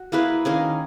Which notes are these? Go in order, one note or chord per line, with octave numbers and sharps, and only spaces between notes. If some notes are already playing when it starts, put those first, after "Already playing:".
Already playing: F#4
A#3 E4 G#4 B4
D#3 A#3 C#4 G#4